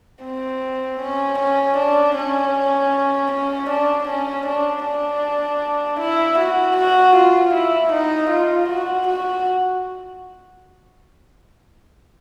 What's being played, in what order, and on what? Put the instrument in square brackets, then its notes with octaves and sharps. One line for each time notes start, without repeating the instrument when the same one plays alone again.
[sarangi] C4
C#4
C#4
D4
C#4
C#4
D4
C#4
D4
D4
E4
F#4
F#4
F4
E4
D#4
F4
F#4
F#4